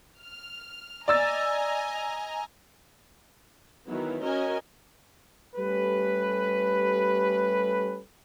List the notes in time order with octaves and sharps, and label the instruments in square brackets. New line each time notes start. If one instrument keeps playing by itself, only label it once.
[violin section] F6
[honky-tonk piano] D5 E6 A6 [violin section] D#5 G#5 A#5
[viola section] D#3 E3 F#3 B3
C#4 F#4 A#4 D#5 G#5
[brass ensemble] G3 A3 C#4 G4 A4 B4